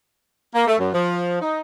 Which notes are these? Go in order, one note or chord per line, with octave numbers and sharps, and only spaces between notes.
A#3
A3
F#2
F3
D#4